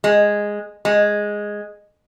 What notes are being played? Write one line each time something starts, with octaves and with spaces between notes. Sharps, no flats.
G#3
G#3